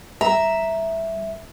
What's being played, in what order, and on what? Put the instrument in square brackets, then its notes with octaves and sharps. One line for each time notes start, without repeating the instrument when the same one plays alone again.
[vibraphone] G3 [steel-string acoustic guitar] E5 [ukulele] A#5